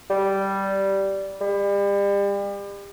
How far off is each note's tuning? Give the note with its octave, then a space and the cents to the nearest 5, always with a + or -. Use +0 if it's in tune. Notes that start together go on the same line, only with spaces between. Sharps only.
G3 -10
G3 +35